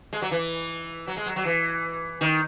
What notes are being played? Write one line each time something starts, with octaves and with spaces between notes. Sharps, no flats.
G#3
F#3
E3
F#3
G#3
F#3
F#3
E3
D#3